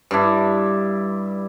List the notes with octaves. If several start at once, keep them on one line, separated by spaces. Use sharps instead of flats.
G2 D4 E4